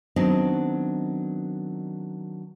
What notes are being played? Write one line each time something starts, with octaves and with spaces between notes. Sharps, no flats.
D#3 F#3 B3 C4 D4 D#4